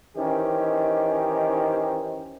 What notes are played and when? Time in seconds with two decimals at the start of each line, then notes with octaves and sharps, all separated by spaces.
0.17 D#3 E3 C#4 D#4 G4 C5